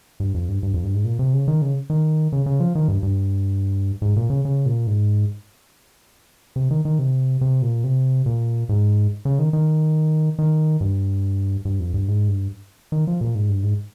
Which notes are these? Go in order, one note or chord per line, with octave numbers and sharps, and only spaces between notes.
G2
F2
G2
G2
F2
G2
G#2
A#2
C3
C#3
D#3
C#3
D#3
C#3
C#3
F3
D#3
G2
G2
G#2
A#2
C#3
C#3
A#2
G#2
C3
D#3
D#3
C3
C3
A#2
C3
A#2
G#2
C#3
D#3
D#3
D#3
G2
G2
F2
G2
G#2
G2
D#3
F3
A#2
G#2
G2
G#2